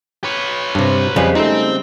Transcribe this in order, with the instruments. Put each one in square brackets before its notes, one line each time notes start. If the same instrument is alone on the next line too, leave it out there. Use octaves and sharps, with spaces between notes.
[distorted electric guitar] B4 C#5
[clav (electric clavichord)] G2 C3
[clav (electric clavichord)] F2 F3 [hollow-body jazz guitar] C#3 G3 G#3
[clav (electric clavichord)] A3 D#4 [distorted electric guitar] C4